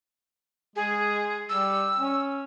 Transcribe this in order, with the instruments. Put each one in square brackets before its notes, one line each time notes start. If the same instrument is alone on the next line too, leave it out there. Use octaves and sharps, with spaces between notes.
[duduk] G#3 [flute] G#4
[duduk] G3 [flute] E6
[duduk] C#4